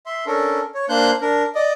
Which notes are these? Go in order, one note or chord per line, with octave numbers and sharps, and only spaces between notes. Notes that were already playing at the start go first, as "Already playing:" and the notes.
E5 C6
C#4 D4 A4 A#4
C#5
A#3 D4 C5 F#6 G6
D4 A#4
D5 D#5